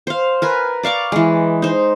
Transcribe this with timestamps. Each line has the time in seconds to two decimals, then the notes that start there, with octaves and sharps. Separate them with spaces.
0.07 C5 F5
0.42 A#4 B4 G#5
0.83 D5 F5 C#6 D6
1.12 E3 G#3
1.62 D#4 C5